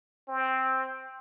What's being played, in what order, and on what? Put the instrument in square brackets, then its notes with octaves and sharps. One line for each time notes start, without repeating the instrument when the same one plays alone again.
[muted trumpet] C4